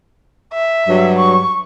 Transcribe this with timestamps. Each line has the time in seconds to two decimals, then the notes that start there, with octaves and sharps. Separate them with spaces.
0.53 E5
0.88 G2 F#3
1.19 C#6